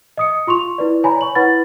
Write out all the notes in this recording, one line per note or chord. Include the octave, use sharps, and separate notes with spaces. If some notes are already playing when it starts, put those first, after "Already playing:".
D#5 D#6 C#7
F4 C6 C#6 F7
E4 B4 D5
C#5 G#5 A#5 B5
C#5 C#6 F#7
E4 B4 F#5 B5 A6